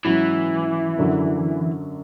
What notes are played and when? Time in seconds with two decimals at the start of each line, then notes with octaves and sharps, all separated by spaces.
0.05 G#2 E3 F#3 C#4 E4
0.97 F#2 D3 F#3